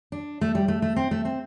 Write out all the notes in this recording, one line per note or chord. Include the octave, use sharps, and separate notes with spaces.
D4
A3
G3
A3
A3
C4
A3
C4